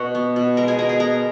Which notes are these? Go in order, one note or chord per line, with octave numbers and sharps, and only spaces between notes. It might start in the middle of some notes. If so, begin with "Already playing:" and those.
Already playing: B2 F#4 F#5
B3
B2
G#3 A#4 A#5
G#4 G#5
B2 A#4 A#5
G#4 G#5
B3 A#4 A#5